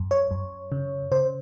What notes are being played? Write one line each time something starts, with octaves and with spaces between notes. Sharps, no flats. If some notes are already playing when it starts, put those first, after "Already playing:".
Already playing: F#2
C#5
F#2
C#3
C#3 C5